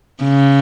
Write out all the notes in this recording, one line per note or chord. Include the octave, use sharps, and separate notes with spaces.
C#3